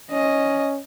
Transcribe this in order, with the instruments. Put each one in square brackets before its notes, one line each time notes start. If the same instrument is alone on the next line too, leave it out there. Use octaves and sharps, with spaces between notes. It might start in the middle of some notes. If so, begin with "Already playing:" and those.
[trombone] C#4 [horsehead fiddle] D#5